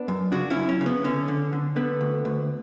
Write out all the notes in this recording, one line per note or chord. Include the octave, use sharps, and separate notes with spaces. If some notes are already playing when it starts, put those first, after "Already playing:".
Already playing: B3 D4
F#2
C#3 D4 F#4
C#4 E4
F#2
C#4
C#3
B3
D3 C#4
D3
D3
D3 B3
D2
D2